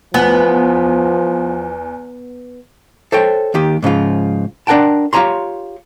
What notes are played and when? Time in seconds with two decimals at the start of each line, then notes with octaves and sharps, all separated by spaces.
0.14 E2 F3 B3
3.12 A4 C5 C#5 G5
3.54 D#2 D#3 G4
3.82 G#2 C#3 F3 F4
4.67 D4 A#4 F#5 G5 A5
5.13 F4 G4 C#5 A#5 C6